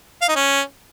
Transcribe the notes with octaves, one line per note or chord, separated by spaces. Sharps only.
F5
D#4
C#4